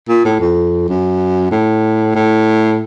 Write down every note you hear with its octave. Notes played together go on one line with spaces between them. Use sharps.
A#2
A2
F2
F#2
A2
A2